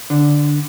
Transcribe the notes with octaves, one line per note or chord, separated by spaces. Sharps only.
D3